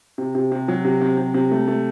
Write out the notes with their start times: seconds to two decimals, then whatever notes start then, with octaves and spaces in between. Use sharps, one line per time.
0.18 C3
0.35 C3
0.52 C3
0.68 F#3
0.85 C3
1.01 C3
1.17 C3
1.34 C3
1.51 A3
1.68 A3